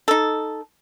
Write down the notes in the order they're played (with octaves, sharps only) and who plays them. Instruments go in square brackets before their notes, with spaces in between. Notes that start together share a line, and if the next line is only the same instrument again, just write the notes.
[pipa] D#4 A4